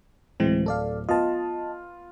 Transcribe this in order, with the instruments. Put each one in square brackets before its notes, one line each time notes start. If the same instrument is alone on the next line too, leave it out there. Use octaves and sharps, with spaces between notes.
[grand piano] D1 [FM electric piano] E3 G#3 C4
[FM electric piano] A4 D5 F5
[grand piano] B3 F4 [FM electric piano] D#5 A5